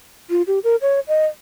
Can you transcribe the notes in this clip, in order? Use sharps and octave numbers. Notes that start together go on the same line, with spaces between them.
F4
G4
A#4
C#5
D#5